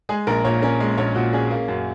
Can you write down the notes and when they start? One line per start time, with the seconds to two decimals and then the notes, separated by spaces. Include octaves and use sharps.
0.09 G#3 G#4
0.27 A#1 A#4
0.45 A#2 C#5
0.62 C#4 A#4
0.80 G#3
0.98 A#1 C#5
1.15 A#2 F#4
1.33 C#4 G#4
1.50 A#3
1.68 F#2